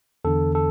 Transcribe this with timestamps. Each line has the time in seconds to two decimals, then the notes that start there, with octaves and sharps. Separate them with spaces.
0.25 E2 D3 A4
0.55 A4